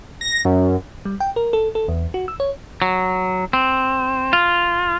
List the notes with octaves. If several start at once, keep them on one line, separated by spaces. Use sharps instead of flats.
A#6
F#2
G3
G5
A#4
A4
A4
E2
F#4
E6
C#5
F#3
C4
F4